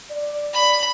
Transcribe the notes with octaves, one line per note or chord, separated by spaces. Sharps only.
D5
B5